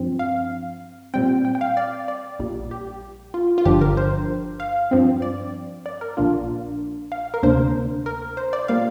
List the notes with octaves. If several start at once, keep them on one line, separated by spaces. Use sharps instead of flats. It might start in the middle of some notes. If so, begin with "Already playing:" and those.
Already playing: G2 F3 C4
F5
A#2 G3 C4 G5
G5
G5
F5
D5
D5
A#1 A#2 G3
G4
F4
F4
G1 G2 D3 F3 D4 G4
A#4
C5
F5
G2 F3 C4
D5
D5
A#4
A#1 A#2 A#3 D4 F4
F5
A#4
D2 C3 A#3 D4 C5
A#4
C5
D5
A#2 G3 A#3 F5